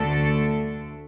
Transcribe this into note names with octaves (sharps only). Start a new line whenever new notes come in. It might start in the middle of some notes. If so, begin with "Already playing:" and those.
Already playing: D2 D3 A3 D4 A4